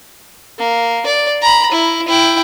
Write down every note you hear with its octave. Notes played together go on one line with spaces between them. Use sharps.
A#3
D5
A#5 B5
E4
E4 G5